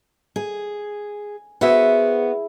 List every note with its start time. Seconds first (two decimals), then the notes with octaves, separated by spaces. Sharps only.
0.36 G#4 G#5
1.61 B3 E4 F#4 G#4 C5 E5